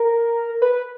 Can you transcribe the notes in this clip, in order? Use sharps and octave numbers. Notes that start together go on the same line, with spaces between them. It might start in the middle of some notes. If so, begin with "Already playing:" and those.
Already playing: A#4
B4